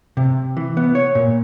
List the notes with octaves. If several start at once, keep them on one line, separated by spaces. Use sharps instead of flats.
C3
E3
B3
C#5
A#2